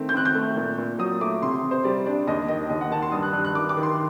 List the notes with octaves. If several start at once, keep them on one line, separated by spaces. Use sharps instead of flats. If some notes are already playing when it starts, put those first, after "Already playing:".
Already playing: D#3 A3 C4
G6
C4 F#6
G6
A3
A#2
A#2
F#3 D#6
A3 D6
C3 C6
C3
C5
G3 D5
D4 D5
D#2 D#5
D#3 D#5
D#2 D#5
F#5
D#3 A5
C6
G2 D#6
F#6
G2 F#6
F#6
D#3 D6
D6
D#3
C6